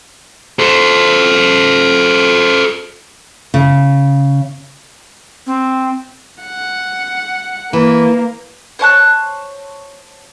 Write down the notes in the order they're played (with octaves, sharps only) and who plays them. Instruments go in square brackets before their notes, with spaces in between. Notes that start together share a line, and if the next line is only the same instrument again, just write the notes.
[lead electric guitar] A4 C5
[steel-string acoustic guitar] C#3
[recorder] C4
[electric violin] F#5
[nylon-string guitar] E3 [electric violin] A#3
[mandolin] C5 C#5 A5 F#6